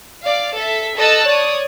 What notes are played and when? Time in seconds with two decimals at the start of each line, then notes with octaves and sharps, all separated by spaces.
0.23 D5 F5
0.57 A4 E5
0.97 A4 D#5 A5 E6 F#6
1.26 C#5 D5 D#6